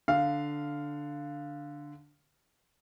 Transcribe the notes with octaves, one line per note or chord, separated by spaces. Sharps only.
D3 F5